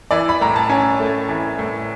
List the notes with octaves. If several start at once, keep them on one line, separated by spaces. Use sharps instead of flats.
E3 D5
B5
A2 A#5
A5
C#4 G#5
A3
E3
A2